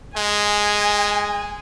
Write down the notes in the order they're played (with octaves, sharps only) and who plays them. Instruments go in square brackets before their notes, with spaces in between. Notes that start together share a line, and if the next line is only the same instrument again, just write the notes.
[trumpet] G#3 [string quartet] G#5